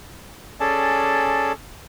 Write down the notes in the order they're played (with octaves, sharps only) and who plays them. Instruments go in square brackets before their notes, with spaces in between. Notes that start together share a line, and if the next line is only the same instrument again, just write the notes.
[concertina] C#4 G#4 A4 D5 A5